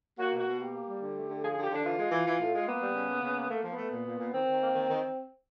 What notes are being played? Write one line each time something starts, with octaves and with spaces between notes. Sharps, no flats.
A#3 F#4
B2
F#4
B2
A#3 G4
A#3
G3
D3
A3
D3
F3 G#4
D3 G#4
G4
D3 D4
E3 F4
G#3
E3
E3
A2
G#3
A#3 B3
G3
C#3
A#3
C#3
A#3
A3 A#3
F3
B3
A3
A#2
A#2
A#2
D#3 C4
D#3
A#3
D#3
D#3